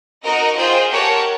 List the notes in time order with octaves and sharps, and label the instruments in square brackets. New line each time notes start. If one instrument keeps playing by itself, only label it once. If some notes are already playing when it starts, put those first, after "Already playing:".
[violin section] D#4 F#4 A#4 D#5
F4 G#4 C5 D#5 G5
G4 A#4 C#5 F#5 A5